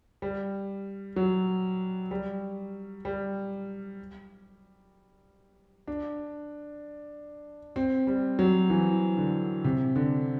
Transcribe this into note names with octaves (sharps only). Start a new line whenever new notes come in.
G3
F#3
G3
G3
D4
C4
G3
F#3
E3
D3
C3
D3